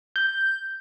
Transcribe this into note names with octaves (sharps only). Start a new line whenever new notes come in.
G6